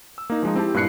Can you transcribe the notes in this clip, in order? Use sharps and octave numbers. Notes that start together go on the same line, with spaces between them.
E6
A#3 D#4
F3 G#3 D#4
C4 E4 G4 A5
G2 A#2 E4 F#6 C7 C#7